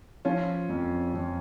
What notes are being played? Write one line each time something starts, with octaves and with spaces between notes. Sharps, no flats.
F3 C#4 F4
F2
F2